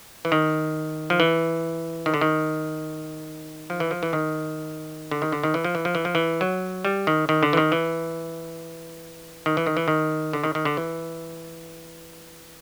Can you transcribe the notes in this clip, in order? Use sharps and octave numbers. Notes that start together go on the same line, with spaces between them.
E3
D#3
F3
E3
D#3
D3
D#3
F3
E3
F3
E3
D#3
D3
D#3
D3
D#3
E3
F3
E3
F3
E3
F3
E3
F#3
G3
D#3
D#3
D3
E3
D#3
E3
D#3
E3
D#3
E3
D#3
D3
D#3
D#3
D3
E3